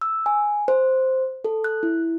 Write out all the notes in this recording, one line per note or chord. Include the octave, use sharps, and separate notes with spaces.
E6
G#5
C5
A4
F#6
E4